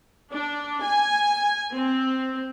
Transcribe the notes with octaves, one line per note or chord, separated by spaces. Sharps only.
D4
G#5
C4